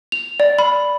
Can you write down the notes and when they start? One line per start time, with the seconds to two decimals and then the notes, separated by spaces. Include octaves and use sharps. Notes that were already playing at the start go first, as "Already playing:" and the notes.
0.12 F7
0.40 D5
0.59 B5